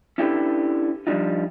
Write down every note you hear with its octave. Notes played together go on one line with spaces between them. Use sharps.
C#4 D4 E4 G4 A4 B4
F3 G3 D4 D#4 F4